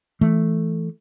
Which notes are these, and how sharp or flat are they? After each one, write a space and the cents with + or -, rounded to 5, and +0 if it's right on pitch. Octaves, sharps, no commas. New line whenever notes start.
E3 +15 A3 +0